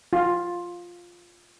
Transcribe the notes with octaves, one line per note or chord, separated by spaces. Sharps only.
F4